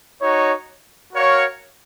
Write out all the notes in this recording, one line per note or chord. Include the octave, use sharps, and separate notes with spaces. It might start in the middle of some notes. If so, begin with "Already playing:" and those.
D#4 F#4 C#5
F#4 A#4 C#5 F5